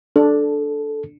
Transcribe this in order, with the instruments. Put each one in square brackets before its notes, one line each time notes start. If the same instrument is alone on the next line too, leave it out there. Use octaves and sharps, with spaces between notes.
[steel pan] D4 [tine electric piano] A4